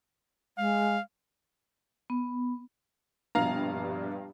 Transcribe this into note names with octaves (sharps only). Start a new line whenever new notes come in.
G#3 F5
B3
A#1 G2 B2 F5 A#5 F7